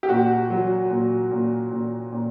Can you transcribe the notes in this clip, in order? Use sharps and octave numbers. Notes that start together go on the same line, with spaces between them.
G4
A#2 F#4
F#3
A#2
A#2
A#2
A#2